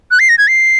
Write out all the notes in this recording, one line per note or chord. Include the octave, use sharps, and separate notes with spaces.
F#6
C7
A#6
G#6
C7